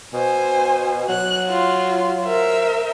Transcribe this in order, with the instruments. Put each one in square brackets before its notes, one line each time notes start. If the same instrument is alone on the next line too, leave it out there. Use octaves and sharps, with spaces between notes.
[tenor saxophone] B2 [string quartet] C5 G#5
[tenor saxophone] F#3 [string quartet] F#6
[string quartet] F4
A#4 C5 E5